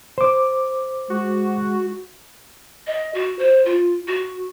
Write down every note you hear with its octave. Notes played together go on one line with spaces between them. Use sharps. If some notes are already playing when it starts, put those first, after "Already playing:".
C5 D6
G#3 F#4
D#5
F#4
C5
F4
F#4